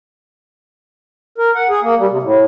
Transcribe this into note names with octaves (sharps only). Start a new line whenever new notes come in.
A#4
F#5
G#4
A#3
G3
C3
A2